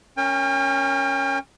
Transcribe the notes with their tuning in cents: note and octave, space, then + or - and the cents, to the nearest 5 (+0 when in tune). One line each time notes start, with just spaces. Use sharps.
C#4 +0 A#4 +0 G5 +40